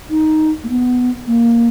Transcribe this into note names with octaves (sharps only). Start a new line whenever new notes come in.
D#4
A#3
B3
A#3